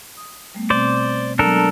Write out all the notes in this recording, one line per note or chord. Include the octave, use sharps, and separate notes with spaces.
D#6
G3 A3 B3
B2 C4 C5 D5
F#3 G#3 B3 D4 A4 A#4